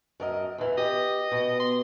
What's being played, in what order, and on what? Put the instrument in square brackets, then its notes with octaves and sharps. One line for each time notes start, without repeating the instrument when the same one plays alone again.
[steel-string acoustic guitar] F#2 A#4 D#5
E2 E3
[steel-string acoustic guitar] G4 [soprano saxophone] D#5
[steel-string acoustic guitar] B2
[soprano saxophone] C6